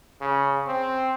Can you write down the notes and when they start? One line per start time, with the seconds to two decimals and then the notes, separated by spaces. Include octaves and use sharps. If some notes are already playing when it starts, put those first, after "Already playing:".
0.21 C#3
0.67 C4